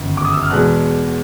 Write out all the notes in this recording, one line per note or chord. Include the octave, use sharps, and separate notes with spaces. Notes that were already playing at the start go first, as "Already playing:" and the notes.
Already playing: G1 F#2 D#3
D6
D#6
E6
F6
E2 B2 G#3 F#6